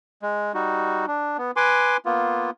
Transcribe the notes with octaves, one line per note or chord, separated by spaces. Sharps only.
G#3
G3 D#4 F#4
D4
B3
B4 G#5 C6 D6
A#3 B3 F4